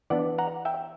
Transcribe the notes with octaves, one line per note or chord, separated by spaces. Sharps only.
E3 B3 D4 D5 F#5
F#5 A#5
E5 G5